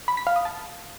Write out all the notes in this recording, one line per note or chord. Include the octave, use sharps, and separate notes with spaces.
B5
B6
F5
D#6
A5